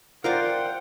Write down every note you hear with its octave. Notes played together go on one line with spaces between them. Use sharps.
F4 A#4 C5 D5 F#5 G5